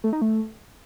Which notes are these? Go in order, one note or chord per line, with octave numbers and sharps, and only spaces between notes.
A3
D#4
A3